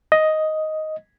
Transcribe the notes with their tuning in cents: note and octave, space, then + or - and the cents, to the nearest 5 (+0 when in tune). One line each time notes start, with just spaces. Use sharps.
D#5 +5